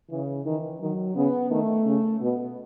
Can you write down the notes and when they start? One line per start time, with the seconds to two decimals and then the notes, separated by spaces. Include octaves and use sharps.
0.10 C#3 E3
0.45 D#3 E3
0.80 D#3 F#3
1.16 C#3 B3
1.51 D#3 A3
1.85 C#3
2.21 B2 B3